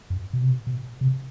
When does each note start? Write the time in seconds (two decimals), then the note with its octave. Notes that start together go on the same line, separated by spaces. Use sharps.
0.10 F#2
0.33 B2
0.42 C3
0.50 B2
0.67 B2
1.01 C3